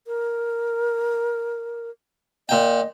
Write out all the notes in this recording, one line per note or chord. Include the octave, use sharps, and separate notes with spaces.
A#4
A#2 D#5 G5